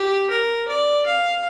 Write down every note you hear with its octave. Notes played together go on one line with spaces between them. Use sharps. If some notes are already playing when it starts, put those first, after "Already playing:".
Already playing: G4
A#4
D5
F5